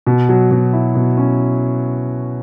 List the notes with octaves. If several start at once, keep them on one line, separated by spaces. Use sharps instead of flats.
B2
F#3
B2
E4
B2
C#4